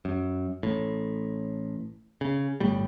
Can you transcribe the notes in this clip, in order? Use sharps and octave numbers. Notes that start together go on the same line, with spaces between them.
F#2
A1 A2
C#3
G1 A2 G3